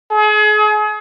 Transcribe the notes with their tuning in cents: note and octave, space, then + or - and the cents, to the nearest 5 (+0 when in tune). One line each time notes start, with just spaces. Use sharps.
G#4 +35